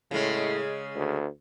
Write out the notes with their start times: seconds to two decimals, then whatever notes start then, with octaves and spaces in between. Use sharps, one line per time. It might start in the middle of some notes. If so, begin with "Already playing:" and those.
0.11 A2 C#3 G#3
0.95 D2